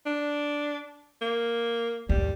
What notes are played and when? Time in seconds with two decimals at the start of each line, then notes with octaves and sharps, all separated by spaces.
0.06 D4
1.21 A#3
2.09 D#2 G#2 G3